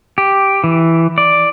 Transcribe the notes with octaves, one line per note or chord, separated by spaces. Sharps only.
G4
E3
D5